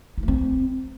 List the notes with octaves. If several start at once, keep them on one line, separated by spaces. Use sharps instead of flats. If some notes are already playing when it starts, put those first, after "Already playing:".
D#4
A3
C4